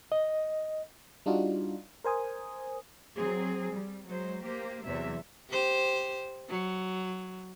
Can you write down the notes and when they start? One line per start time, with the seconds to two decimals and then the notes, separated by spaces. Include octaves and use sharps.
0.12 D#5
1.26 G3 D4 D#4 F4 F#4
2.04 A#4 C5 G#5 D#6
3.16 F#3 C4 G#4
3.72 G3
4.07 F#3 G#3 C5
4.43 A#3 G4 C5
4.84 E2 C3 E3 F#3 E5
5.50 G4 C5
6.49 F#3